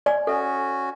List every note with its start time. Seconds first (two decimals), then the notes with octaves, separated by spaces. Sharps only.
0.06 D5 G#5
0.27 C#4 F#4 A4